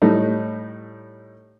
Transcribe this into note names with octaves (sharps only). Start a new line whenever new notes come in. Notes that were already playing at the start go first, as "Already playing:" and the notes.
A2 G3 A3 D#4